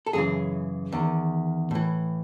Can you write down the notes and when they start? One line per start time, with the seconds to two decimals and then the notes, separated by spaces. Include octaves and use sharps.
0.06 A4
0.13 F#2 C#3 E3 G#4
0.92 E2 D#3
1.71 A2 E3